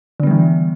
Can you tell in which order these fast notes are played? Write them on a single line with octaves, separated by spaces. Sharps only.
D3 B3 G3 E3